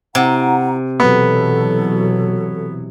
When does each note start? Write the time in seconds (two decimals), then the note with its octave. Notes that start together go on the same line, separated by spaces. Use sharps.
0.15 C3 E4 F#5 A#5
1.00 B2 E3 F#3 B3 A4